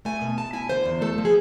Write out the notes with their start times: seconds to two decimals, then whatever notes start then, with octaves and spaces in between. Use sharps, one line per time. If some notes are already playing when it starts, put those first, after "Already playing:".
0.05 A3 G#5
0.22 B2
0.38 B2 A5
0.53 E4 G#5
0.69 D3 C5
0.85 E2
1.01 A3 A4
1.18 F3
1.25 G#4